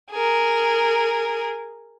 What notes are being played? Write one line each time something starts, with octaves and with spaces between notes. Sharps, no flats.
G#4 A#4